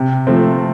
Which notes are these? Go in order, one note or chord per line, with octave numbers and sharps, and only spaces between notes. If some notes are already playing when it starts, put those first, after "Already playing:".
Already playing: C3
F3 A3 C4